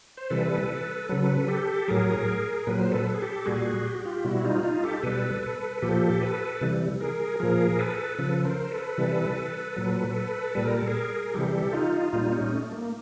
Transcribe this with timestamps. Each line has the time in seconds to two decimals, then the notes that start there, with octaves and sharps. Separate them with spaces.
0.17 C5
0.30 C3 E3 G3 A4 B4
1.09 C#3 F#3 A4 B4
1.48 G4 A4
1.88 A2 F#3 G#4 A#4
2.67 A#2 F#3 B4
2.80 C5
2.92 A4 B4
3.06 A4
3.14 G#4
3.22 G4 A4
3.46 A#2 G3 F#4 G#4
3.85 G4
3.95 F#4
4.05 F4 G4
4.24 B2 G3 E4 F#4
4.44 D#4 F4
4.63 D#4 F4
4.84 G4 A4
5.03 B2 G3 A4 B4
5.43 A4 B4
5.82 A#2 F3 G4 A4
6.22 A4 B4
6.61 C3 E3 G3
7.00 G#4 A#4
7.40 A#2 F3 G#4 A#4
7.79 A4 B4
8.19 C#3 F3 A4 B4
8.38 B4
8.45 A#4 C5
8.71 A4 B4
8.98 C3 E3 G3
9.76 A#2 F#3
10.55 A#2 G3 B4
10.65 A#4
10.77 A4
10.88 G#4 A#4
11.34 C3 E3 G3 G4 A4
11.73 D#4 F4
12.12 A#2 G3 D#4 F4
12.32 C#4 D#4
12.52 A3
12.72 A#3